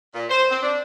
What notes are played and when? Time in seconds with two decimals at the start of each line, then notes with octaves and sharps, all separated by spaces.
0.14 A#2
0.30 C5
0.50 C4
0.62 D4